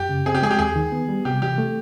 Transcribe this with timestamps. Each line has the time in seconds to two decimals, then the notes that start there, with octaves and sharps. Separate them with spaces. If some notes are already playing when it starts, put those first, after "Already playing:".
Already playing: F#2 G4
0.09 C#3
0.26 C4 G#4
0.35 G4
0.43 G#3 G#4
0.51 G4
0.59 D#2 G#4
0.76 D#3
0.92 B3
1.09 G3
1.25 C3 G4
1.42 E3 G4
1.58 A3